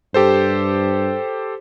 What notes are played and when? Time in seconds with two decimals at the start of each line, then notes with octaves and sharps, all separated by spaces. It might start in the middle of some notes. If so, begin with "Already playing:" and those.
0.14 G2 G4 A4 C5